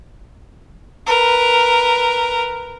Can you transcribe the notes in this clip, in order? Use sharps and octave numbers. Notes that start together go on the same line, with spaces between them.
A#4 B4